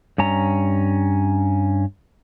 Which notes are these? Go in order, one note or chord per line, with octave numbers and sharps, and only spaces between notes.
G2 C#4 A#5